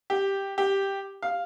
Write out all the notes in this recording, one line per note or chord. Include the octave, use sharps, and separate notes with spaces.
G4
G4
F5